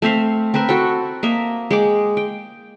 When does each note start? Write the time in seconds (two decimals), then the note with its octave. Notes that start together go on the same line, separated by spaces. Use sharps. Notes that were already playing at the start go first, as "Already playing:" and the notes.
0.02 A3 C4 E5 F5
0.54 C4 A#4 B4 E5
0.69 F#4 A4 G5
1.23 A#3 D#5 E5
1.71 G#3 G5 D6
2.17 G5